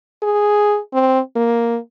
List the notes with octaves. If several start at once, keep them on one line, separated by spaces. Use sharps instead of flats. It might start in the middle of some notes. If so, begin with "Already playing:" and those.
G#4
C4
A#3